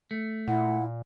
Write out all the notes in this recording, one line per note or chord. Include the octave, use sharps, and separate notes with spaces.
A3
A#2 E4 F#5